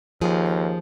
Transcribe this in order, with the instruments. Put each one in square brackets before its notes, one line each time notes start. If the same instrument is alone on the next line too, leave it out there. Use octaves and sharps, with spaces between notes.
[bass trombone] D#2 [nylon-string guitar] F3 G#4